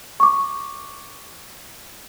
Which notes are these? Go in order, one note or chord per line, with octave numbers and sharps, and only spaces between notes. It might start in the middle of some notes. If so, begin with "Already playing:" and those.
C#6 D6